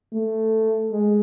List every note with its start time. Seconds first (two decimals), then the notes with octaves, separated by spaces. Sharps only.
0.14 A3
0.93 G#3